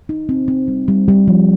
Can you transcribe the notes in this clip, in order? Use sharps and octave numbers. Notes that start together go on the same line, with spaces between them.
D#4
C4
C4
G3
G3
G3
F3